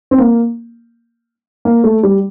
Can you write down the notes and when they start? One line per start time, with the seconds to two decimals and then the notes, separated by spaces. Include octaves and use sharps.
0.11 C4
0.18 A#3
1.65 A#3
1.84 A3
2.03 G3